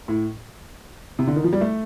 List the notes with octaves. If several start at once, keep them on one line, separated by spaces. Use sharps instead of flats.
A2
C3
D3
D#3
F3
G3
A3